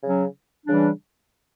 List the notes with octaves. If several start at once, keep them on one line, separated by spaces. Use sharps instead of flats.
C#3 F#3 C#4
C#3 E3 G3 D4